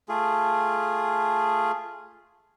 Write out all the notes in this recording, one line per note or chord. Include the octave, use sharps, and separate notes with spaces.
A3 F4 G#4